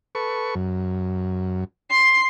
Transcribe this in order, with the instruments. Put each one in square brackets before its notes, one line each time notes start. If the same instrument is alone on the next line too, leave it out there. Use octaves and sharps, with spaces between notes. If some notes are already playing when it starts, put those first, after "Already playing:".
[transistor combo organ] A4 B4 C#6
F#2
[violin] C6 C7